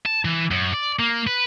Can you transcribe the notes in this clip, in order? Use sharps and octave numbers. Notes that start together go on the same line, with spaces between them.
A5
E3
F#2
D5
A#3
B4